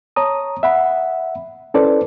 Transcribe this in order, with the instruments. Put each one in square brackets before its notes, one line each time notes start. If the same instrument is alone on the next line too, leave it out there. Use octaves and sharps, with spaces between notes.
[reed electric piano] C#5 A5 A#5 D#6
E5 F#5 B5
C#4 E4 A4 B4 C5 D5